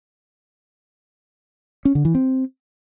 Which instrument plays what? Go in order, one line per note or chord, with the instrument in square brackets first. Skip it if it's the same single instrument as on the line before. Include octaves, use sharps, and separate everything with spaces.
[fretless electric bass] C#4
D3
E3
C4